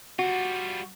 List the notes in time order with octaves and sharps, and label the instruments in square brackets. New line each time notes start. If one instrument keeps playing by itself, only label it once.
[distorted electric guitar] G3 F4 [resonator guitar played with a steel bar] F#4